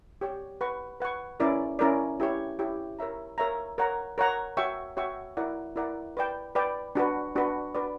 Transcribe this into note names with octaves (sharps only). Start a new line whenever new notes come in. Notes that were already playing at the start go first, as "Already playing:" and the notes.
G4 C#5 G5
B4 F#5 C#6
B4 F#5 C#6
C#4 E4 A#4 D5
C#4 E4 A#4 D5
E4 G4 C#5
E4 G4 C#5
A#4 C#5 E5 A#5
A#4 C#5 E5 A#5
A#4 C#5 F#5 A#5
A#4 C#5 F#5 A#5
F#4 C#5 E5 G5 C#6
F#4 C#5 E5 G5 C#6
E4 A#4 D5 F#5
E4 A#4 D5 F#5
B4 D5 G5
B4 D5 G5
D4 F#4 B4
D4 F#4 B4
D4 F#4 B4 D5